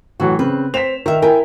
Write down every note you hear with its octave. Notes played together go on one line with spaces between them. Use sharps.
A2 E3 F#3 F#4
C#3 C4 B4
C4 B6 E7 F7
D#3 A#4 E5
E4 A#4 G5 G#5